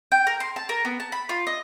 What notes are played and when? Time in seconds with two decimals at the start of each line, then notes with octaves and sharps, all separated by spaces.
0.12 G5
0.27 A#4
0.40 C6
0.56 A5
0.69 A#4
0.85 B3
1.00 A5
1.12 B5
1.29 F4
1.47 D#5